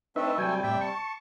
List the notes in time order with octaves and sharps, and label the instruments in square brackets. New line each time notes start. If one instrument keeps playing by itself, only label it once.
[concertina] A3 A4 [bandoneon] C4 D4 [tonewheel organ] D#4 B4 E5
[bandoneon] C3 G3 [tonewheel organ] F#3 G5 G#5
[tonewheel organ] A2 D5 [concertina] E5 G5
[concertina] A5 [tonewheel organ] C#6